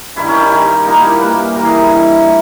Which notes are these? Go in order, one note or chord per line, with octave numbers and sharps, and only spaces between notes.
G2 D#3 G3 E4
C#4
G4
E4
G2 D#3 G3
A#2 G3 A#3 D#4
E4
G4
A#2 G3 A#3 B4
G2 E3 G3 A#4
G#4
D#4
E4
G2 E3 G3
A#2